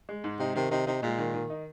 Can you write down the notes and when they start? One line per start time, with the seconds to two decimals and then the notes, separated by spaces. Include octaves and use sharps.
0.09 G#3
0.24 G#2
0.40 C3 D#4
0.55 C3 D#3
0.71 C3 D#4
0.87 C3 D#4
1.02 A#2 G#3
1.18 D#3
1.34 D#3
1.50 D#4